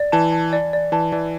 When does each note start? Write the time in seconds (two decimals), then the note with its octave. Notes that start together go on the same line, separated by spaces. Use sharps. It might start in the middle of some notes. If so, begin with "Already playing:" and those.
Already playing: D5
0.12 E3 A5
0.33 A5
0.53 D5
0.73 D5
0.92 E3 A5
1.12 E3 D5